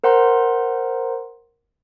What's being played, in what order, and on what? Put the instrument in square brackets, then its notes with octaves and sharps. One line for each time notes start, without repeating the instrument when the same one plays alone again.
[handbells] A#4 C5 F#5 A#5 C6